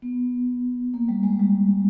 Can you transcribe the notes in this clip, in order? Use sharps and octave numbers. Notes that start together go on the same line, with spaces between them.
B3
A#3
G3
G#3
G3